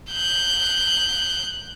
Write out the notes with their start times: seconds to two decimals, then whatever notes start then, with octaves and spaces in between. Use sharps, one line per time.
0.11 F#6 G6